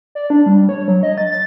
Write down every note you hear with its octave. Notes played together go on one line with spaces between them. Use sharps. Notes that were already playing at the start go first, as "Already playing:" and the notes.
D5
D4
G3
C#5
F#3
D#5
A6
A6